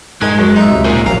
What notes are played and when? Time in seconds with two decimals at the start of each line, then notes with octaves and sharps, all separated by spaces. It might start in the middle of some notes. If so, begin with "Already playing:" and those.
0.22 G#2 G#3 A#4 D#5 G#5
0.39 F#2 G#4
0.56 D#4 E5
0.71 C#2 C3
0.85 A#2 G#4 C5
1.06 A#1 F#3 F5 A#5